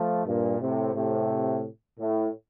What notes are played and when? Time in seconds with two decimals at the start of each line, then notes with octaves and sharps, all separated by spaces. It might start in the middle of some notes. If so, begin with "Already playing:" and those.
Already playing: F3 A3
0.25 G2 A#2
0.59 A2 C3
0.94 A2 C3
1.98 A2